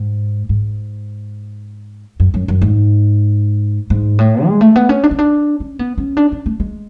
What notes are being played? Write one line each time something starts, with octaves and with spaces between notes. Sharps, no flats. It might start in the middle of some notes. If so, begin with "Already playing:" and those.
Already playing: G#2
G#2
F#2
F#2
F#2
G#2
G#2
A2
G#3
A3
B3
C#4
D4
C#4
D4
C#4
B3
C#4
D4
C#4
A3
G#3